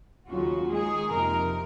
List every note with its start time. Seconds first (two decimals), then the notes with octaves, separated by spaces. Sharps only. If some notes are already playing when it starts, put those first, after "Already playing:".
0.27 D#2 C#3 F#3 C#4 F4 F#4
0.70 D#3 G#3 D#4 G#4
1.11 F2 C3 F3 A#3 D#4 A#4